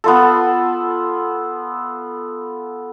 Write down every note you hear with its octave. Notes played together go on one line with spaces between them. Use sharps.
B3 F4 A4